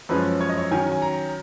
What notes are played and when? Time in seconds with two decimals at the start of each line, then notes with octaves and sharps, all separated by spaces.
0.09 F#2 F3 G#3 C#4 B4
0.40 C#5
0.49 D#5
0.57 C#5
0.71 D#3 F#3 C#4 G#5
0.92 G#5
1.02 A#5